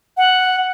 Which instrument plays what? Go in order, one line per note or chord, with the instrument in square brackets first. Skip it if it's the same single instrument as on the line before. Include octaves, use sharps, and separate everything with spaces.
[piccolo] F#5